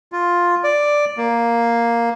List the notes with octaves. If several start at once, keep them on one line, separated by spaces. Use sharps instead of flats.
F4
D5
A#3